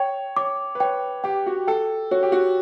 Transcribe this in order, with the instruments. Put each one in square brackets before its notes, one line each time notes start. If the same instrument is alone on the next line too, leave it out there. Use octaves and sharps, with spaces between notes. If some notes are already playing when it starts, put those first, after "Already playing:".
Already playing: [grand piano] C#5 [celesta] G5
[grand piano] C#5 [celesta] D6
[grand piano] B4
[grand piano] C#5 [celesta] G5
[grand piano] G4 [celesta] G5
[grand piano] F#4
[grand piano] A4 [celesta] G5
[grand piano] F#4 [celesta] C#5
[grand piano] G4
F#4